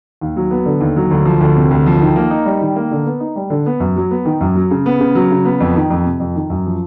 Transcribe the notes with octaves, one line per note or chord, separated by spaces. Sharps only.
D#2
F#3
B3
D3
D#2
F#3
D2
F3
D2
C3
D2
F3
D#3
A#3
D#4
G3
D#3
A#3
D3
B3
D#4
G3
D3
B3
F#2
F#3
B3
D#3
F#2
F#3
C#3
B3
C#3
F#3
C#3
B3
F2
D#3
F2
C3
F2
D#3
F#2
F3